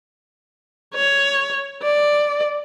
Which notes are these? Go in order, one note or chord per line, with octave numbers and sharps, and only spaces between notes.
C#5
D5